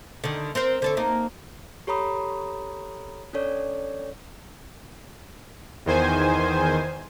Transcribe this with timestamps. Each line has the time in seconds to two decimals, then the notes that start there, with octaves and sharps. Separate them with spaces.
0.24 D3 D#3
0.55 C4 A#4 C5
0.82 D3 A4 C#5
0.97 A#3 D#4
1.87 G4 A4 C#5 A#5 B5 D#6
3.33 C#4 D4 A4 C#5 D5
5.86 E2 D#3 C5 G#5